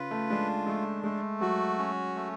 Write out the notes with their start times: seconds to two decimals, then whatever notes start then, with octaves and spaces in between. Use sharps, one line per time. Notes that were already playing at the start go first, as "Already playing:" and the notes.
Already playing: C#3 F4 B4
0.11 A3
0.30 G#3 D4
0.67 G#3 A3
1.04 G#3 A3
1.41 F#3 F#4
1.78 C#4
2.15 A3